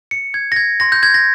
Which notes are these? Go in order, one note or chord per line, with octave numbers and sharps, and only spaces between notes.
C#7
G#6
A#6
G#6
C6 G6 A#6
G6
G#6
A#6